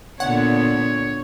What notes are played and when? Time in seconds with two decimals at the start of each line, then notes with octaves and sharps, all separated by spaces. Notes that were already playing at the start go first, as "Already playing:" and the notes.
0.20 A#2 D3 B3 C#5 F#5